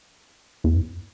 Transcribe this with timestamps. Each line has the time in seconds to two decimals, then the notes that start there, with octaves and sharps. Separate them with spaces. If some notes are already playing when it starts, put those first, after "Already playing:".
0.64 E2
0.76 F#2